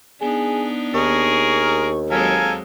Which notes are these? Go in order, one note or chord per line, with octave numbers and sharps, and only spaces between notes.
B3 D4 D#4 G#4
D#2 G#4 A#4 C#6
F#3 G#3 C4 A4 A#4 F5 G#5